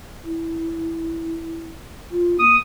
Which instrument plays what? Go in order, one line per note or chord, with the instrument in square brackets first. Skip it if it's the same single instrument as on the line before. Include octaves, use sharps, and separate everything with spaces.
[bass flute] E4
F4
[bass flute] A#3 [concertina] D#6